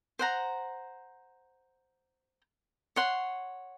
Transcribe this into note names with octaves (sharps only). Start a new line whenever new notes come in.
C5 F#5 A#5
C#5 F#5 C6